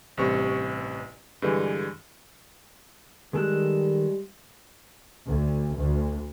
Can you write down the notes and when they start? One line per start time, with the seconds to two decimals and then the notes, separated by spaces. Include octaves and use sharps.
0.17 A1 G2 C3 C#6
1.42 G2 D3 E3 G#3
3.33 D#3 G3 G#3 A4 F#6
5.26 D2
5.75 D2